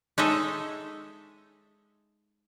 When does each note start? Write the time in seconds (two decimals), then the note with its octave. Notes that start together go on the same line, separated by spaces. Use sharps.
0.18 G#3 D#4 A4 C#5 D#5 E5